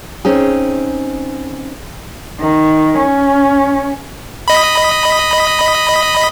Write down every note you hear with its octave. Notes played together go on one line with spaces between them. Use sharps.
C4 C#4 D#4 G#4
D#3
C#4
D#5 B5